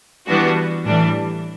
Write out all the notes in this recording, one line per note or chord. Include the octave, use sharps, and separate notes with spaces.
E3 G3 B3 D4 F#4
A2 E3 G3 D4